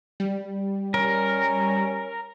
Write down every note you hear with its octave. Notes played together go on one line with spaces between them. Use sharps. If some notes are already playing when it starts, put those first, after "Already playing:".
G3
C#4 A#4